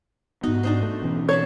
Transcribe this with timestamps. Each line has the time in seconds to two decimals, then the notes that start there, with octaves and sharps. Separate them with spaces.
0.43 G#2 B3 D#4 F#4
0.63 D4 D#4 C5
0.83 A3
1.02 B2 E3 C#4
1.29 C5 C#5 A5 B5